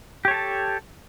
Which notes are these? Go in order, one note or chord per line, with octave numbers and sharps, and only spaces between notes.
G4 A4 C#5 A5